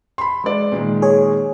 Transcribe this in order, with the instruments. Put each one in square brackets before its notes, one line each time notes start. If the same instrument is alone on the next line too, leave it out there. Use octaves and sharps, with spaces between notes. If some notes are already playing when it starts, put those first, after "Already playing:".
[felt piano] B5 C6
G#3 D5
A#2 D#3 G#3
[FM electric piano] G#4 C#5